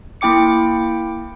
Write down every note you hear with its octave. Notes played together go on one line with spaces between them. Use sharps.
A#3 E4 G5 D6 C#7